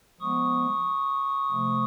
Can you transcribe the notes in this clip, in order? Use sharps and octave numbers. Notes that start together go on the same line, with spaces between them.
F3 G#3 B3 C#6 D#6
C3 F3 A3